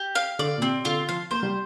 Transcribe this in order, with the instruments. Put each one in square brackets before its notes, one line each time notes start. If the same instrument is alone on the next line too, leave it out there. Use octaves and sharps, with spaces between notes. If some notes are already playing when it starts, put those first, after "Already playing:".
Already playing: [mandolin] G4
F5
[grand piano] D3 [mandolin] D5
[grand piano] A#2
[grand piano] C3 [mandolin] C4
[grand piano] D3 [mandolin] F4
[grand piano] F3 [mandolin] F5
[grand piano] A#3 [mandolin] C5
[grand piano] G3